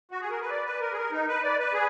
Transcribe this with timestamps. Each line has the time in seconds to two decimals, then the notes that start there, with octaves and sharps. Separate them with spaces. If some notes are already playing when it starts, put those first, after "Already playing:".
0.11 F#4
0.21 G#4
0.30 A#4
0.41 B4
0.50 D5
0.66 B4
0.81 A#4
0.93 G#4
0.97 A#4
1.12 D#4
1.28 B4
1.43 D5
1.59 B4
1.74 G#4